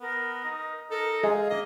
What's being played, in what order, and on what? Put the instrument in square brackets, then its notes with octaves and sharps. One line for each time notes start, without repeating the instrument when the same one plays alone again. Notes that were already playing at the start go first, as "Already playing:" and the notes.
[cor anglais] B3 [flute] A#4
[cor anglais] D#4
[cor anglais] D#4 [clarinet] A4 [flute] A#4
[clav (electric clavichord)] G#3 [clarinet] G#4 [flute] F5
[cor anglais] A#3 [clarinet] D#5 [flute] E5